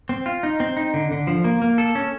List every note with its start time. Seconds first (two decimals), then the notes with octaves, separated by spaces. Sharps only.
0.09 C4
0.26 F4
0.43 D#4
0.60 C4
0.77 D#4
0.94 D3
1.11 D3
1.27 F3
1.44 A#3
1.62 A#3
1.78 A4
1.95 C#4